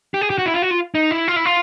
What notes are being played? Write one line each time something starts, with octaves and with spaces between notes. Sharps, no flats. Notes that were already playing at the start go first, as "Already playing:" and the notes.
G4
G#4
G4
F#4
E4
F4
F#4
F4
D#4
E4
F4
E4
F4